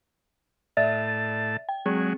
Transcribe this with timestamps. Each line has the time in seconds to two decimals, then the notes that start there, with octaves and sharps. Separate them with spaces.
0.77 A2 D5 E5 A5 A6
1.69 G5
1.86 F#3 G#3 C4 G#4